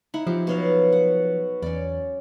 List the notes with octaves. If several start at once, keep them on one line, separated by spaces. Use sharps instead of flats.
D#4 E4 F#5
F3 C4 G4
B2 F#3 F5
F#5
E2 C#4 D5